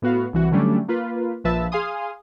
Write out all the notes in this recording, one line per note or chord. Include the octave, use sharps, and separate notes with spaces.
A2 B3 F#4 F5
C2 E3 F#4
D3 F#3 G3 A3 C#4 D4
A#3 F4 B4
A#1 F3 B4 E5 A5 E6
G#4 F5 G#5 C6 D#6